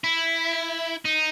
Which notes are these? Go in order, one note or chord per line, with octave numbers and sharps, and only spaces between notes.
E4
D#4